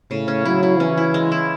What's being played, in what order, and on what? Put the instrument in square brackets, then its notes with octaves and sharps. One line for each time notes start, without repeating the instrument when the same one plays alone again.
[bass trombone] A2 [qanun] C#3
[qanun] C#4
[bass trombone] F#3 [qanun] E4
[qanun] E4
[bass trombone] E3 [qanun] C#4
[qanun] E4
G#3
E4